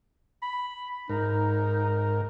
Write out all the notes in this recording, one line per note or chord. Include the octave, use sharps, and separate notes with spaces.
B5
G#2 D#4 A#4